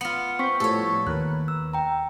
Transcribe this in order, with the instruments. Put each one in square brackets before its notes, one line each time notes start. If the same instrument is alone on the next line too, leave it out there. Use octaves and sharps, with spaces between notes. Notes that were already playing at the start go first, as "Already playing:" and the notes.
[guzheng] B3 F4 [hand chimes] C#7
[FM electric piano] C4 G6 [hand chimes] C#6 B6
[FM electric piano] A2 F3 G3 [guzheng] A4 C#5
[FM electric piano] D#2 A#4 B4 [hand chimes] F#6
[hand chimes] E6
G5 A#5